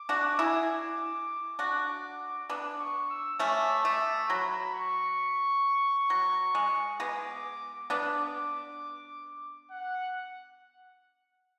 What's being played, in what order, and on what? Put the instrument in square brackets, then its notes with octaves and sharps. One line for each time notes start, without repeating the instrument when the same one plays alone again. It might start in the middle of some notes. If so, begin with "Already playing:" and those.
Already playing: [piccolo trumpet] D6
[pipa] D4 F#4
E4 G#4
[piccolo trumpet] D6
[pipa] D4 F#4 [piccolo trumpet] D6
[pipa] B3 D4 [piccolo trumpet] D6
[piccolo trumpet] C#6
E6
[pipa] A3 C#4 [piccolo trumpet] D6
[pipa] A3
[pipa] F#3 [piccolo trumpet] B5
[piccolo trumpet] C#6
[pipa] F#3
G#3
[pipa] G#3 B3 [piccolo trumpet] D6
[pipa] B3 D4 [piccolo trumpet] D6
[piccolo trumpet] F#5